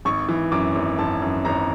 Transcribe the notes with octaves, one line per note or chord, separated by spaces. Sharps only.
G#1 C#6
E3
F#2 D6
G#1
G#1 A5
F#2
G#1 A#5